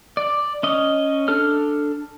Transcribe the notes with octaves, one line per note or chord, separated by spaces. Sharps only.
D5
C#4 D#5
D4 A4 F6